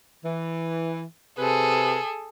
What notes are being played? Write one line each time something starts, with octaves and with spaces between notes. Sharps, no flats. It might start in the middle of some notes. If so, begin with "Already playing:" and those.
E3
C3 G#4 A4 B4